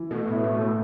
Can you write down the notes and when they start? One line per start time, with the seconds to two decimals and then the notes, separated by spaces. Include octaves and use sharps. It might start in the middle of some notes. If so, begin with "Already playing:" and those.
Already playing: E3
0.11 B2 A3
0.27 A2
0.33 E4
0.44 A2
0.54 A2 A3
0.61 B2